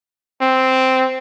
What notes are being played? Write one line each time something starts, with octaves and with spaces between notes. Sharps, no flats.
C4